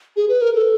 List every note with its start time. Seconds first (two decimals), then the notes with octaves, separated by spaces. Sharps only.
0.16 G#4
0.29 B4
0.41 A#4
0.55 A4